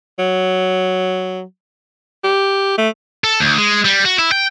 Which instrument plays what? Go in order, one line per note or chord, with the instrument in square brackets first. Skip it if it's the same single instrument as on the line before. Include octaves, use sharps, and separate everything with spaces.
[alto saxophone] F#3
G4
A3
[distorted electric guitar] A4
D2
G#3
G3
F#4
E4
G5